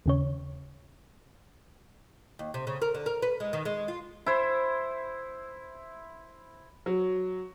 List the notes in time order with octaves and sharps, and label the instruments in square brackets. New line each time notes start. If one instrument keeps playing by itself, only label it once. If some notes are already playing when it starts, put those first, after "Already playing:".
[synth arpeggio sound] D#2 C#3 C#5
[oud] D#2
C3
C#3
A#4
D3
A#4
B4
G#3
D#3
G#3
F4
[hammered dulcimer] E4 C5
[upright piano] F#3